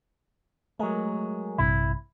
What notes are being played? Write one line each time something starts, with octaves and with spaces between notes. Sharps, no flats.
F#3 G#3 A3 A#4
A#1 G2 C3 E4